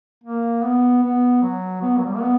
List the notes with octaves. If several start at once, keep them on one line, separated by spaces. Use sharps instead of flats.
A#3
B3
B3
F#3
B3
F#3
G3
A#3
B3